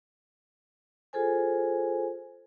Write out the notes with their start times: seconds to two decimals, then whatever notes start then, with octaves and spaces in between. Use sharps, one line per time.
1.13 F4 G#4 A4 C5 G#5